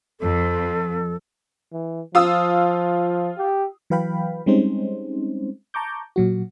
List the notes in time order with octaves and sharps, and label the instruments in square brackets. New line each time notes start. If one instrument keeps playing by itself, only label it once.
[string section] F2 [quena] A4
[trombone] E3
[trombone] F3 [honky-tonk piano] F4 D#6 E6
[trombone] G4
[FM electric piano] E3 F#3 B4 F5 G5 B5
G3 G#3 C4 C#4 D#4 C5
A5 A#5 C#6 D6 G6
A#2 F#3 F#4